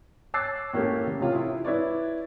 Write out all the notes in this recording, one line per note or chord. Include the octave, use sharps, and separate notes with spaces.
C#5 D6 E6 F#6 A6 C7
A2 A#3 C#4 G4 A4
C#3
A2 C3 C#4 F4
E4 D#6
E4 B4 C#5 D5